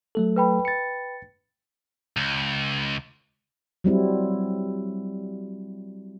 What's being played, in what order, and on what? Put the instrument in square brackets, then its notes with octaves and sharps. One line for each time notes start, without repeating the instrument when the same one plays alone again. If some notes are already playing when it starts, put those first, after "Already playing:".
[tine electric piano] F#3 A3 A4
[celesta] B4 G5 B5
[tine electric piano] A6 C#7
[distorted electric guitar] C#2
[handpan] F#3 G3 C4 E4